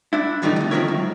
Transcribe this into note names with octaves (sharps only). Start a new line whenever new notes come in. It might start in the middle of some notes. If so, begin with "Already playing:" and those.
D4 E4
A2 D#3 E3 G3 A3 D#4
D2 B2
D#3 F3 A3 E4 A#4 C#5
C#2 F#2